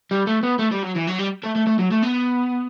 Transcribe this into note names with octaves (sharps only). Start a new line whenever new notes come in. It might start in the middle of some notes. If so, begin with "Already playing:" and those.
G3
A3
B3
A3
G3
F#3
E3
F#3
G3
A3
A3
A3
F#3
A3
B3